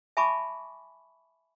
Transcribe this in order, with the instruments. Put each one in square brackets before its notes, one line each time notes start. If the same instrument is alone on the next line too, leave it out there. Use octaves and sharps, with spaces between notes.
[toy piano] E5 G#5 A5 B5 C#6 D6